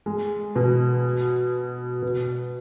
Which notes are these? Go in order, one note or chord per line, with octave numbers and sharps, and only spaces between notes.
G#3
B2
B2